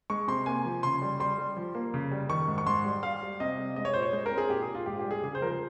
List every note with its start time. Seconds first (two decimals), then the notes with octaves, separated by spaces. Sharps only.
0.10 G#3 C#6
0.28 C3 C6
0.46 A#3 G#5
0.65 F3
0.83 C#3 C6
1.02 G3
1.20 G3 C6
1.38 G3
1.57 F3
1.75 A#3
1.94 C#3
2.11 G3
2.29 D#3 C#6
2.48 G#2
2.58 C#6
2.66 G#2 C6
2.85 G3
3.03 G3 F5
3.22 G3
3.40 C3 D#5
3.59 G3
3.76 G#3 D#5
3.85 C#5
3.93 A#2 C5
4.03 C#5
4.13 G#3 C5
4.26 A#4
4.32 C4
4.38 G#4
4.50 A#2 G4
4.62 G#4
4.68 A#2
4.75 F4
4.86 G#2 G4
4.99 G4
5.05 G3
5.11 G#4
5.23 C#3 G#4
5.35 C5
5.42 F3 A#4
5.47 C5